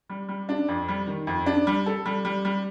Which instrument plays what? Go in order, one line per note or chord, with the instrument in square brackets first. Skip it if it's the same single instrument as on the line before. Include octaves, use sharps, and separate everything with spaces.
[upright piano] G3
G3
D4
F2
G3
D#3
F2
D4
G3
A4
G3
G3
G3